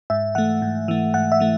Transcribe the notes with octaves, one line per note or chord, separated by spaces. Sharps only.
G#2 E5
E3 A3 F#5
G#2
E3 A3
G#2 F#5
E5
E3 A3